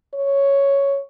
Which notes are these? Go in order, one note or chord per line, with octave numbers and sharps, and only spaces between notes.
C#5